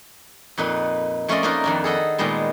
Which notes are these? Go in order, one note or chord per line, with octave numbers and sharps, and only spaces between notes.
F2 A#2 D#4 B4
F3 A3 C#4 F4 D5 D#5
A#3 C#4 D#4 F4 A#4 B4
F2 D#3 D4
G#4 A4 D#5 F#5
A#2 D#3 G3 G#3 B3